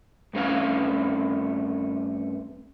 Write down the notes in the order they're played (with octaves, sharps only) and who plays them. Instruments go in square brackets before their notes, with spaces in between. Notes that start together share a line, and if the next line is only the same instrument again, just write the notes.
[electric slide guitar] G2 A3 C4 C#4 F5